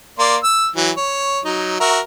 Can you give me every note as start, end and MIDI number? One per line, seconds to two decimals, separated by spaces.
0.19 0.37 58
0.19 0.37 74
0.19 0.37 84
0.43 0.69 88
0.76 0.91 52
0.76 0.91 54
0.97 1.40 73
1.45 1.78 54
1.45 1.78 63
1.80 2.00 66
1.80 2.00 70
1.80 2.00 76